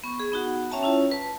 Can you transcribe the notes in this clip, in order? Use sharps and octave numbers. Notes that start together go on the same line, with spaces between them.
B3 C#6
G#4
B3 D#4 F#4 F#5
C#4 C#5 E5 G5 A5 A#5
C#4 E4 F4 C#5
B4 A5